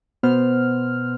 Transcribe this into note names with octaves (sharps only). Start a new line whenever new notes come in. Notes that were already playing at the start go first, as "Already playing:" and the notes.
B2 B3 C5 F6